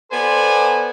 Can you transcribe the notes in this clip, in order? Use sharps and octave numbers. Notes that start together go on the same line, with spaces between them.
B3 A4 C5 D5 G#5